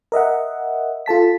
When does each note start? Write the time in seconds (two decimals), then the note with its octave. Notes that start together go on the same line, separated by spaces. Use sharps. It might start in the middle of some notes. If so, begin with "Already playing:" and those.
0.12 A#4 D#5 E5 F#5
1.06 F4 A4 A5 B6